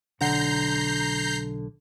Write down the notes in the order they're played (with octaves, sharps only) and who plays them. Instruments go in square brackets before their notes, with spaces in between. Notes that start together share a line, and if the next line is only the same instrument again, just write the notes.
[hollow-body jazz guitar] B1 D3 F#5 [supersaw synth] A#5 G6 C7